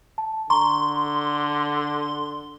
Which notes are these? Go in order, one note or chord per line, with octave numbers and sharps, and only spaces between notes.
A5
D3 A#5 C6 C#6